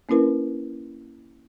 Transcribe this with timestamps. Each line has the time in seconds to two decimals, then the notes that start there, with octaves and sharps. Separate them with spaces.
0.09 A#3 C#4 D4 E4 A#4 B4